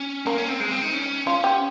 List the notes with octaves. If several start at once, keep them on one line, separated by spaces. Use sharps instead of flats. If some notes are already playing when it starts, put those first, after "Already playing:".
Already playing: C#4
A#3 A#4
C#4
C4
G#3
C4
D#4
C#4
C#4 F4
G4